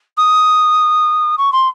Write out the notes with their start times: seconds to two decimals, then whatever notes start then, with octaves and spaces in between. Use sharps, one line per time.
0.17 D#6
1.38 C#6
1.52 C6